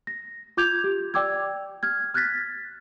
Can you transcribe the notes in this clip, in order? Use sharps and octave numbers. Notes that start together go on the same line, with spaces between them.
A#6
F4 D6 G6 G#6 F7
G4
D5 G5 D6 E6 G#6
F6 G#6
F6 F#6 G#6 A6 B6